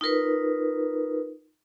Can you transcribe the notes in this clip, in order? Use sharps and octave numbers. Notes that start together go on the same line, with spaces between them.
D#4 F4 A#4 B4